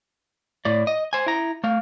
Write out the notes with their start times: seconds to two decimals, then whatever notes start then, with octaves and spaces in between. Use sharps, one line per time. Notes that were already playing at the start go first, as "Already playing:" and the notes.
0.65 A2 D5
0.87 D#5
1.13 C5 G#5
1.26 E4 A#5
1.64 A3 F5